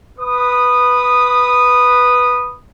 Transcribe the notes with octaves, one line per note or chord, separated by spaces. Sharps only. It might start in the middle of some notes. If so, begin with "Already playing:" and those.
B4 D#6